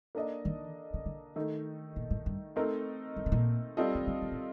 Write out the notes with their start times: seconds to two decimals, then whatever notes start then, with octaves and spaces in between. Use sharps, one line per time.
0.15 A#3 D4 A4 D#5
0.45 D#3
0.94 C3
1.06 D3
1.36 D#3 A3 D#4
1.96 A#2
2.11 A2
2.26 G2
2.56 A3 C4 D#4 A#4
3.17 G2
3.26 C3
3.32 A#2
3.77 G3 C4 F4 A4 D#5
3.95 D#3
4.07 D3
4.22 C3
4.31 A2